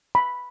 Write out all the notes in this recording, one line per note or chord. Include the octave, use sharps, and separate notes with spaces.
B5